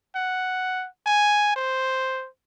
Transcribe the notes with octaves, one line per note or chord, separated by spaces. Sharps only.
F#5
G#5
C5